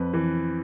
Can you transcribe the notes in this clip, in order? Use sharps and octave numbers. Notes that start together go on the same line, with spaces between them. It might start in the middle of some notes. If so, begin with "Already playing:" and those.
Already playing: F2 B4
E3